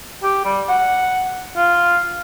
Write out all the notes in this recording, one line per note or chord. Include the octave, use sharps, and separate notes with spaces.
G4
G3
F#5
F4